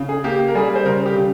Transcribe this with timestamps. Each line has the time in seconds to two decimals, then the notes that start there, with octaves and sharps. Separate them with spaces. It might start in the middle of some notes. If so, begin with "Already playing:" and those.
Already playing: C#3
0.09 G#4
0.24 A#3 G4
0.48 A#4
0.55 G3 G#4
0.75 C5
0.85 C#3 A#4
1.06 G4
1.16 C#3